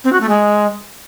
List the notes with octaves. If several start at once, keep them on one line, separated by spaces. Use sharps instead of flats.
C4
F#4
A3
G#3